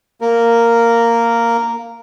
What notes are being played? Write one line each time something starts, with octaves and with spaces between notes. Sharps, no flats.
A#3 A#4